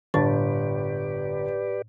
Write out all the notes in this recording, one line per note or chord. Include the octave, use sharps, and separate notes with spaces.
G1 A2 G4 B4 D5 A5 A6